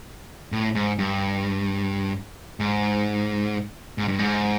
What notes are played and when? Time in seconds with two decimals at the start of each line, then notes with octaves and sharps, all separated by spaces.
0.52 A2
0.75 G#2
0.99 G2
2.60 G#2
3.98 G#2
4.08 G2
4.19 G#2